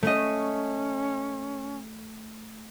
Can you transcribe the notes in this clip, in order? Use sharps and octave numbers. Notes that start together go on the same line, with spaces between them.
A3 C#4 D#5